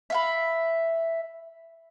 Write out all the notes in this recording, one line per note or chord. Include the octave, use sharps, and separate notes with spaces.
E5 F5 B5